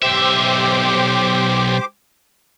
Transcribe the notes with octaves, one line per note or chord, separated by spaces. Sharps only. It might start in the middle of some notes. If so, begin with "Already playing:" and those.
B1 G4 C5 E5 D6